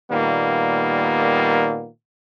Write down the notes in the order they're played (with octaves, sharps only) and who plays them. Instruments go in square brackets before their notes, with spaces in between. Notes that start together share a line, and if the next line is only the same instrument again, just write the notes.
[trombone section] A#2 D#3 G3 A#3 B3